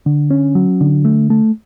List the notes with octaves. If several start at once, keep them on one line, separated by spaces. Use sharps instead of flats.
D3
C#4
F#3
D3
A3
A3